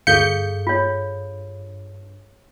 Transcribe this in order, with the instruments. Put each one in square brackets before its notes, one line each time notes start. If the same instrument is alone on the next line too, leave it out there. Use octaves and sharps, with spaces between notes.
[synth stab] D2 G6 C#7 [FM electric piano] G2 [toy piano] G#4 A4 F5
[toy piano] F4 C#5